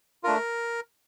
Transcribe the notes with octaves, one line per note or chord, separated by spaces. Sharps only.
A3 D4 F4 A#4